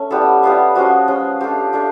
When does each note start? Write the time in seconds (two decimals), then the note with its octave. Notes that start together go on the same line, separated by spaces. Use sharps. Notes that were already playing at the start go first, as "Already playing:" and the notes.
Already playing: A3 C#4
0.11 G3 B3 E4 A4
0.43 G3 B3 E4 F4
0.75 F3 G#3 C#4 F4 F#4
1.08 F3 G#3 C#4 F4
1.41 A3 D4 F4 G4
1.73 A3 D4 F4